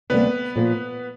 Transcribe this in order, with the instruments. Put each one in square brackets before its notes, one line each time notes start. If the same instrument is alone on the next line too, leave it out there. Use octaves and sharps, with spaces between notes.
[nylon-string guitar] D2 C3 D#3 G3 A#3 [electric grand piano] B3 B4
[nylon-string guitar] A#2 F3 A#3